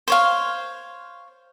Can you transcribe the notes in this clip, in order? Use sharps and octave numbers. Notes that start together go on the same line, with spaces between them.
C5 C#5 F5